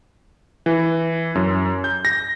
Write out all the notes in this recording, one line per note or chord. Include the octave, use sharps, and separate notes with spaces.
E3
F#2
G6
A#6